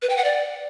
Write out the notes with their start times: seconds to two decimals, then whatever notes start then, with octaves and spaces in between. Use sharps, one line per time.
0.02 B4
0.10 G5
0.17 F#5
0.24 D5